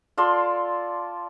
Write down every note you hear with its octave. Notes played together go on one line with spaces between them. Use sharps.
F4 A4 D5 C6